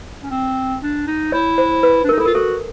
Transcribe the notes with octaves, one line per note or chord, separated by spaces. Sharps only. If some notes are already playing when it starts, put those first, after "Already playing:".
C#4
C4
D4
D#4
E4 C#5
C5
B4
D4
A#4
D#4
E4 A4
F4 A#4
F#4 A4